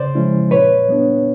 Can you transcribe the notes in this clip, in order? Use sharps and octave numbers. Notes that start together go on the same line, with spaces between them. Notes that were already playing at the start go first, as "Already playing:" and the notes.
Already playing: C#3 C5 D5
F3 G#3 C#4 E4
A#2 B4 C#5
G3 B3 D4